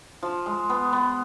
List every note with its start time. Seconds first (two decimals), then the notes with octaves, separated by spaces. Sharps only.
0.23 F3
0.46 G#3
0.70 B3
0.93 B3